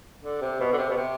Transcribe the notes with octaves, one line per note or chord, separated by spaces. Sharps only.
D3
C3
B2
D3
C3
B2
C3